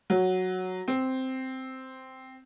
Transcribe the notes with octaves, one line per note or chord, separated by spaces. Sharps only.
F#3
C4